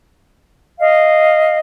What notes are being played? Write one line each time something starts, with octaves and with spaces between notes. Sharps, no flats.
D#5 F5